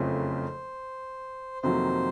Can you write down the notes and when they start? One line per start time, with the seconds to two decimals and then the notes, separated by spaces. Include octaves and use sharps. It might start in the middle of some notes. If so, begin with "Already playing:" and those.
Already playing: F#1 F2 C#3 F3 A3 C5
1.62 F2 C3 D#3 F#3 A#3 C5